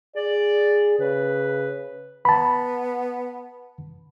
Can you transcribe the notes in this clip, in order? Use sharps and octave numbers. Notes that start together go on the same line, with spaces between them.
G#4 D5
C#3 B4
B3 A5 B5